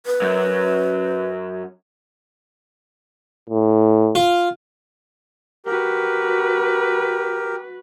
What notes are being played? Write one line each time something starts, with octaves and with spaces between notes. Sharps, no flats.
B4
F#2 F#3
A2
F4
F#4 G4 A#4 B4